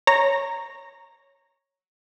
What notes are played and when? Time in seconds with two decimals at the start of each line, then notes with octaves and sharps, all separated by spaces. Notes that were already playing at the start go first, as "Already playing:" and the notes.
0.07 C#5 A#5